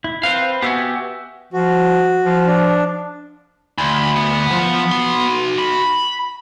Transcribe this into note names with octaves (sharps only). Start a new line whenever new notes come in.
E4
C4 B4 C5 F5
B3 F#4 G4 E5 G#5
F3 F#4
F3
D4
D2 B5 C6
B3
F3 F4
F#4 C6
B5